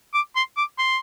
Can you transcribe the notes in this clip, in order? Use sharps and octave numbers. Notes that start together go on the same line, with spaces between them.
D6
C6
D6
C6